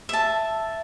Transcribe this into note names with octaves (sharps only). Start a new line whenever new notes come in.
E5 A5